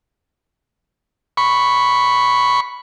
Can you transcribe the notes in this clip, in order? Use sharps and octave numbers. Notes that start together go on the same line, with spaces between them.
B5 C#6